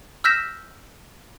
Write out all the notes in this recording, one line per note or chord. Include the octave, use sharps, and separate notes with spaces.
E6 F6 G6 A#6 B6 E7